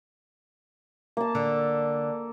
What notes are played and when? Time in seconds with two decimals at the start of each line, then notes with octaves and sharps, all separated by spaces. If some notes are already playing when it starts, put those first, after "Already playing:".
1.17 A#3 A5
1.35 D3